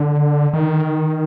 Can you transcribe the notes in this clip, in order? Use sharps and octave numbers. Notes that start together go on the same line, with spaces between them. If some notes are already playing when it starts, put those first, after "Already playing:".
Already playing: D3
D#3